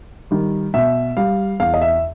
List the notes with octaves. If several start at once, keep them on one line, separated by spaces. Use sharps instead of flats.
D#3 G3
B2 E5
G3 F5
E2 F5
D#5
E5